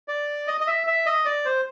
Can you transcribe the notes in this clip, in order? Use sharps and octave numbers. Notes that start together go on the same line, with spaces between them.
D5
D#5
D#5
E5
E5
D#5
D5
C5